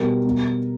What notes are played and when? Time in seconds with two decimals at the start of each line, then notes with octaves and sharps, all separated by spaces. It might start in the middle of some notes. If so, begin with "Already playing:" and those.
Already playing: B2 G3 A#4
0.25 B2 G3